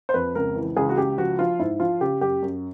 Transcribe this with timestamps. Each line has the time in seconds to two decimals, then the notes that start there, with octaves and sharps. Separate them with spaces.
0.09 C5
0.14 F2 B4
0.35 C#2 A#4
0.56 E3
0.76 C#2 G#4
0.89 F#4
0.97 C#2 G4
1.18 F3 F#4
1.39 F3 F4
1.59 G#2 E4
1.80 F3 F4
2.01 C#3 G4
2.21 F#2 G4
2.42 F#2